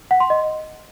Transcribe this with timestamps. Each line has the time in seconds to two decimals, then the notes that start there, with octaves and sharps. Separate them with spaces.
0.11 F#5
0.20 C6
0.30 D#5